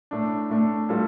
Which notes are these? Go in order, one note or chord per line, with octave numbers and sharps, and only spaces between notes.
A2 A3 D4
A2 A3 D4
A2 G3 F4 A4